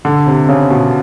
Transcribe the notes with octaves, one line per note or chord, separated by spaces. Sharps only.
D3
C3
C#3
B2